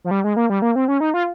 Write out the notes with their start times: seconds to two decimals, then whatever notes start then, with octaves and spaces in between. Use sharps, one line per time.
0.04 F3
0.11 G3
0.24 G#3
0.36 A#3
0.50 G3
0.62 A#3
0.76 C4
0.88 C#4
1.00 D#4
1.14 F4